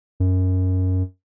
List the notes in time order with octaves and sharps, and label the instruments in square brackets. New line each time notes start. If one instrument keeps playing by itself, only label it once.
[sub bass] F#2